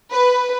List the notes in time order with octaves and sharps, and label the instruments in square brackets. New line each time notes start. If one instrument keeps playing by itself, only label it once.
[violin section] B4